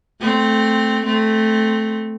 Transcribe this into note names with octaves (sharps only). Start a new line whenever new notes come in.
A3 C4
A3 C4